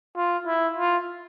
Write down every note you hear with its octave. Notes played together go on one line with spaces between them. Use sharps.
F4
E4
F4